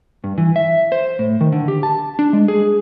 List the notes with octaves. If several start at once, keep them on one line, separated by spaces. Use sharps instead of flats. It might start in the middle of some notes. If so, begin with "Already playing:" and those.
G2
E3
E5
C5
A2
D#3
D3
G4
A5
D4
G#3
G#4